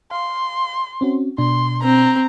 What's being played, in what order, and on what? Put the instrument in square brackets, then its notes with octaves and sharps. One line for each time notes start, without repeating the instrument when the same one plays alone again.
[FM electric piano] F5 [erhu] C6
[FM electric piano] C4 C#4 F#4
[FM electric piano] B2 D4 [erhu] C6
[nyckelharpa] C4 [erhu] A#5